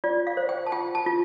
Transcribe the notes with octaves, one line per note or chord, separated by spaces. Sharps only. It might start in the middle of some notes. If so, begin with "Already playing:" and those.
F4 D5
F5
C5
G5
A5
F4 G5
A5
F4